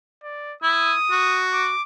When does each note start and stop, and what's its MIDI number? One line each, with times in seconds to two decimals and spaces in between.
0.23 0.55 74
0.63 0.93 64
0.63 1.46 87
1.11 1.70 66
1.53 1.83 86